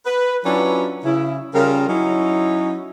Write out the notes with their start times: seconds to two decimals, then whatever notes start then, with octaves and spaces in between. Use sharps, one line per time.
0.06 B4
0.45 F#3 C#4 D4 E4 F4 B4
1.05 C#3 E4
1.55 C#3 G3 F4 A#4
1.88 F#3 C#4 D#4 E4